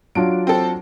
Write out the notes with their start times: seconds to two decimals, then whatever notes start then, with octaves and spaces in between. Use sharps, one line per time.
0.15 F#3 D4 F4 D7
0.47 C4 A4